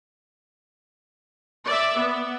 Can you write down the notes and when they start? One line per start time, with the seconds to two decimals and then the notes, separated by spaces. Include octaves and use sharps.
1.66 D5 E5
1.99 B3